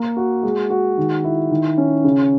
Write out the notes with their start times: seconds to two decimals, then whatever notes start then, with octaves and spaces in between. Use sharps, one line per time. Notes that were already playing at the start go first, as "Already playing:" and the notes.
Already playing: A#3
0.17 F#4
0.43 G#3
0.70 F#4
0.98 D#3
1.24 E4
1.51 D#3
1.78 C#4
2.04 C#3